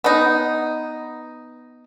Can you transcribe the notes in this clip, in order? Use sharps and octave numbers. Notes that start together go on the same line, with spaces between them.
B3 D#4